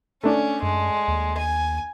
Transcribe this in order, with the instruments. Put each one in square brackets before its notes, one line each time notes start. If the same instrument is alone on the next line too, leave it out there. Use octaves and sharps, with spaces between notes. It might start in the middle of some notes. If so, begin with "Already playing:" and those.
[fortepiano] A3 D4 [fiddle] C#4
[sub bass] F#2 [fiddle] G#3
[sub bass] D#2
[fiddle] G#5